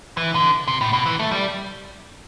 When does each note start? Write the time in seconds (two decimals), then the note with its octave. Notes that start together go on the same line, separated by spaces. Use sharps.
0.17 E3
0.35 D3
0.68 C3
0.81 A2
0.93 B2
1.06 E3
1.19 A3
1.31 G3